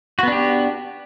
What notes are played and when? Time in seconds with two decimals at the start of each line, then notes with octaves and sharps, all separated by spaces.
0.19 F#4
0.23 B3
0.28 D4
0.32 G4